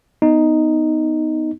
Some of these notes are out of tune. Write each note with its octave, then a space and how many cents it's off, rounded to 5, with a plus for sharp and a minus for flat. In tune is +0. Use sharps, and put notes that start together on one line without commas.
B3 +10 D#4 +0